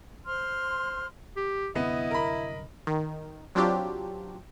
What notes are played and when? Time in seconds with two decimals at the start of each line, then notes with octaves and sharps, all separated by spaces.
0.25 C5 C6 F6
1.37 G4
1.75 C2 F#2 D3 B3 E4 D#5
2.11 A#4 B5
2.87 D#3
3.55 F#3 C4 D4 F4 G4